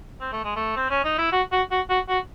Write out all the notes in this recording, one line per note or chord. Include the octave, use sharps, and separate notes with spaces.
C4
A3
G#3
A3
C4
C#4
D#4
E4
F#4
F#4
F#4
F#4
F#4